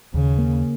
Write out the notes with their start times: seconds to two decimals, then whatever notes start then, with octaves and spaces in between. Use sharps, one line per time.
0.14 D#2 C#3
0.38 A#3